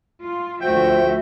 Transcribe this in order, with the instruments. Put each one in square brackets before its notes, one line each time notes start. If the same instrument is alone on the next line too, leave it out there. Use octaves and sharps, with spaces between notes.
[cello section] F4
[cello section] D2 F#4 E5 [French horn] F3 [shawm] G5